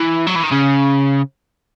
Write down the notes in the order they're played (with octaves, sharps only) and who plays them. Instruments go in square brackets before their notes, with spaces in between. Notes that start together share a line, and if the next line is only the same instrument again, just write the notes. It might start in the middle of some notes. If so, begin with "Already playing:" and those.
Already playing: [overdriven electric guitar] E3
F#3
E3
D#3
C#3